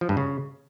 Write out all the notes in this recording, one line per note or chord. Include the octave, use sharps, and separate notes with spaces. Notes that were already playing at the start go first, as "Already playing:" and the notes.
F3
G2
C#3